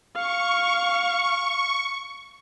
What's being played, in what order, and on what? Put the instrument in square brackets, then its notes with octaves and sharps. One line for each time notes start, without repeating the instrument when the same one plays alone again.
[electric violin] F5 [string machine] C#6